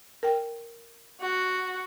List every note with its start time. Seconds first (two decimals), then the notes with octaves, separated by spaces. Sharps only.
0.23 A#4 G5
1.21 F#4